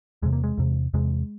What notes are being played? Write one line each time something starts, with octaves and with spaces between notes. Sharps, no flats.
E2 C3 G#3
A#3
G#3
E2 C3
E2 C3 G#3